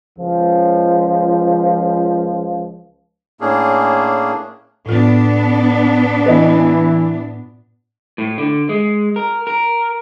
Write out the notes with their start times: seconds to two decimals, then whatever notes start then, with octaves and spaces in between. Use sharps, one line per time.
0.18 C#2 F3
3.41 A2 A#3 C#4 D4 G#4
4.86 A2 B3 D4 F4
6.26 E3 B4 D#5
8.18 A2
8.38 D3
8.69 G#3
9.16 A#4
9.47 A#4